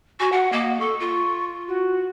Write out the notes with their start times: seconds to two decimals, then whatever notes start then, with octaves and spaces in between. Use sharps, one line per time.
0.20 F#4 G#5
0.32 F#4 F#5
0.52 A#3 D#5
0.80 A4 C#6
1.00 F4
1.68 F#4